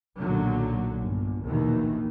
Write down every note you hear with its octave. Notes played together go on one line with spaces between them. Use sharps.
B1 A#2 D3 D#3 F#3
G1
A#1 D#2 B2 D#3 E3